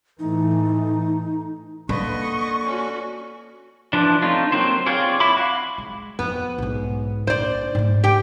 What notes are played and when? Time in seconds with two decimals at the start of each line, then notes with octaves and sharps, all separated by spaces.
0.19 A2 E3 A3 D#4
1.89 D3 A#3 B4 D#5 B5 C#6
2.64 C#4 F#4
3.93 E3 F3 D4
4.22 A3 C4 C#4 D#4 F4
4.52 F#3 A#3 C4 C5
4.86 C4 F4 G#4 C#5 D5
5.20 E4 B5 D6
5.37 F#4 F5
5.78 G#3
6.19 F2 B3
6.58 B1 G#2
7.27 A#1 D#4 C5 D5
7.75 G#2 A3
8.04 G4 G5